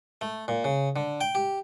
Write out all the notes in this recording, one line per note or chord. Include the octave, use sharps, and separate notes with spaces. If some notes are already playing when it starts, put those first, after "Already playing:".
A3
A#2
C#3
D3
G5
G4